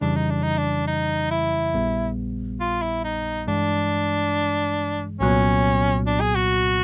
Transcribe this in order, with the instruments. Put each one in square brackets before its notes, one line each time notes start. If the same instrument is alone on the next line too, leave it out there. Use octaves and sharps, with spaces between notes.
[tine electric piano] F2 C#3 E3 G3 [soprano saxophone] D4
[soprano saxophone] D#4
D4
D#4
D4
D#4
E4
[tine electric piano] A#1 A#2 G3 B3
[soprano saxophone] F4
E4
D#4
[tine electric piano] G2 E3 G#3 [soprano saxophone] D4
[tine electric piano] C2 A#2 F#3 B3 [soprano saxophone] C#4
[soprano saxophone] D4
G#4
F#4